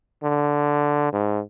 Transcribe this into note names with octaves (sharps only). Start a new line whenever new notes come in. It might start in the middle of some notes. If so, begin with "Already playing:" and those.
D3
G#2